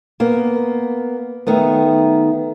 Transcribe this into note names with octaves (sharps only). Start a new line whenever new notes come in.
A#3 B3
D#3 A3 B3